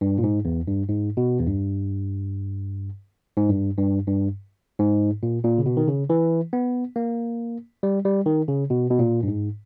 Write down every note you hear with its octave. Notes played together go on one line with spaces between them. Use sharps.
G2
A#2
G#2
E2
G2
G#2
B2
E2
G2
G#2
G2
G2
G2
G#2
A#2
A#2
C#3
B2
D#3
C#3
E3
B3
A#3
G3
G3
D#3
C#3
B2
B2
A#2
G2
G#2